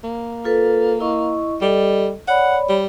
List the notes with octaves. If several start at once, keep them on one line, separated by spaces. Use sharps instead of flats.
A#3
F4 A4 B4
E4 D#5 C#6
G3 A4 D#5
C#5 D5 F#5 B5
G3